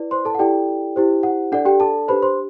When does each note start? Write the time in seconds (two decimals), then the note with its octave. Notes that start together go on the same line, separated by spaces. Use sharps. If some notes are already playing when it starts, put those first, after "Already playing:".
Already playing: E4 B4 D5
0.11 C5 C6
0.25 A4 A5
0.35 F#5
0.39 E4 G4 A4 D5 G5
0.96 E4 G4 C5
1.23 F#5
1.52 D4 A4 D5 F#5
1.65 G4 G5
1.80 A4 A5
2.08 D4 G4 B4 C5 B5
2.22 C5 C6